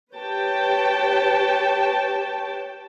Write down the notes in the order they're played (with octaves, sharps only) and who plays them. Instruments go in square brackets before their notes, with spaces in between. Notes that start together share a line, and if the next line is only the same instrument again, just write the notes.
[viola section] G4 B4 C#5 G5 A5